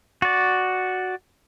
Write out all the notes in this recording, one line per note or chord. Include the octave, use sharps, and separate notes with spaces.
F#4 D5